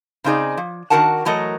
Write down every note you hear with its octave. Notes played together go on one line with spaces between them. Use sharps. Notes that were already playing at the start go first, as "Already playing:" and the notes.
C#3 C4 D#4 G#4 D5
F3
D#3 D4 F#4 A#4 F#5 A5
E3 F#3 A3 A#4 D#5